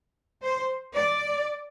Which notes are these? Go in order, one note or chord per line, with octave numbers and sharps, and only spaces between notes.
C5
D5